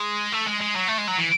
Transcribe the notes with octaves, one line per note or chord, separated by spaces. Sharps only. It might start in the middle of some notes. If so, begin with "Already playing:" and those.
Already playing: G#3
A3
G#3
G#3
F#3
A3
G#3
F#3
E3